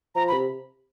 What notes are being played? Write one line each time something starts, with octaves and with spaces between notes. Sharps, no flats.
F3 A#5
B5
C3